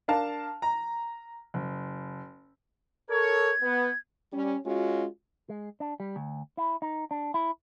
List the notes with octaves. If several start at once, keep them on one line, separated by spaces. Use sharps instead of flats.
D4 A#4 F5 A5
A#5
F#1
A4 A#4 C#5 G#6
B3
G3 C#4
G#3 C#4 F4 F#4
G#3
D4
G3
D2
E4
D#4
D4
E4